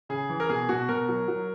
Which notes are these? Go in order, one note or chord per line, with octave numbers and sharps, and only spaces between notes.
C#3 G#4
E3
A#4
B2 G#4
B2 F#4
B2 A#4
F#3
F#3